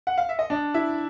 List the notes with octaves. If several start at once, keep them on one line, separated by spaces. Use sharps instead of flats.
F#5
F5
E5
D#5
D4 D5
E4 E5